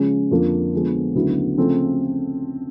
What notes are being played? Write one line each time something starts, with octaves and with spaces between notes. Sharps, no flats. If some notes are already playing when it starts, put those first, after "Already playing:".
Already playing: C#3 F3 G#3 C#4
F2 D3 F3 A#3
D3 F3 G#3 B3
D2 C#3 F#3 B3 E4
C#3 F3 A3 C4